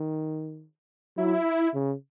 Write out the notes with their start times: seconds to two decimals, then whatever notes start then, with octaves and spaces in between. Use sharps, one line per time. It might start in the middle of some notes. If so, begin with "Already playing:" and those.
Already playing: D#3
1.17 F#3 E4
1.74 C#3